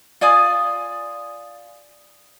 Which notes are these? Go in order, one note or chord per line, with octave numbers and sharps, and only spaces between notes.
F4 D5 G#5 D#6